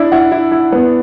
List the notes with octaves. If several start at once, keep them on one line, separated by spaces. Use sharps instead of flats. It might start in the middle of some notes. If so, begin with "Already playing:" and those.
Already playing: D4 E4
E4 F#5
E4
E4
B3